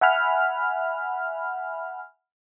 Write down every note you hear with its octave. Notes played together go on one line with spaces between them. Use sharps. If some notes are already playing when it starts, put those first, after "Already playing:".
E5 F#5 G#5 B5 F6